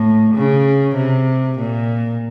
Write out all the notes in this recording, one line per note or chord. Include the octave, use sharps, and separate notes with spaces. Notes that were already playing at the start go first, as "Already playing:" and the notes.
Already playing: A2
C#3
C3
A#2